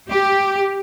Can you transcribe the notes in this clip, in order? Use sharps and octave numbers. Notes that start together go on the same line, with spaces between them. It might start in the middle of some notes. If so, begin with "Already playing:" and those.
G4